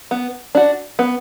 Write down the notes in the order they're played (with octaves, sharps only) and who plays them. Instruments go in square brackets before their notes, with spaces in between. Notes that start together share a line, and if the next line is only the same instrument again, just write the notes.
[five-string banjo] B3
D4 F#4
B3